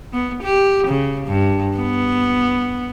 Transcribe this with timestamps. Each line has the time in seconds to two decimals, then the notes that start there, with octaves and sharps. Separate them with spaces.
0.13 B3
0.43 G4
0.87 C#3
1.27 G2
1.77 B3